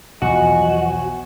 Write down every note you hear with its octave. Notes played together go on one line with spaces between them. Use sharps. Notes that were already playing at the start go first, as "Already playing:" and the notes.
B1 E2 F3 F#4 D#5 G#5